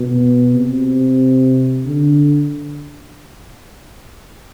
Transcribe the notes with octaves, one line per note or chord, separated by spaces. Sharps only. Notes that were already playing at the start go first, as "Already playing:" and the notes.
Already playing: B2
C3
D3